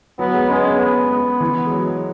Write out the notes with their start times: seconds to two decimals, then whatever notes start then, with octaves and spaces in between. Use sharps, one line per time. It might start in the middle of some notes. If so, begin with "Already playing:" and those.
0.19 F#3 B3
0.34 G#3
0.49 G#3 C#4
0.65 B3
0.79 G#3 B3
1.10 G#3
1.40 E3
1.66 G#3
1.71 F#3